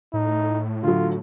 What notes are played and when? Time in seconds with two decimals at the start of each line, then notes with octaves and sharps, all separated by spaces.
0.14 A2 D#4
0.83 D3 F#3 F4